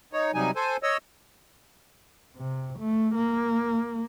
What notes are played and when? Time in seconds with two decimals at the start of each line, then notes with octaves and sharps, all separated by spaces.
0.13 D#4 C#5
0.34 C3 F#3 G3 D#4 G#5
0.56 A4 C5 G#5
0.83 C#5 D#5 E6
2.37 C3
2.79 A3
3.15 A#3